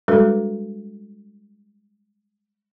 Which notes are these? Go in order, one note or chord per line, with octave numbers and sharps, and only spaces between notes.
G3 G#3 D4 F#4 A4 B4